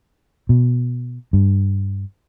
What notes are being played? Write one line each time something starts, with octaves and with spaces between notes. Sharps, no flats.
B2
G2